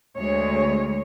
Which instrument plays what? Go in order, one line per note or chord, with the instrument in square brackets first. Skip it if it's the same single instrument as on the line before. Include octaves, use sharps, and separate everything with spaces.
[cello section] D2 G#3 C#5